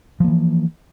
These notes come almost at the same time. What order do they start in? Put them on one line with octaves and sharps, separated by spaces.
F3 A#3 E3